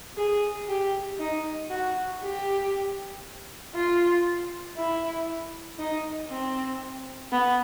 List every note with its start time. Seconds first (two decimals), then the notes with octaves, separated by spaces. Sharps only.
0.17 G#4
0.69 G4
1.20 D#4
1.70 F#4
2.22 G4
3.75 F4
4.77 E4
5.79 D#4
6.30 C4
7.32 B3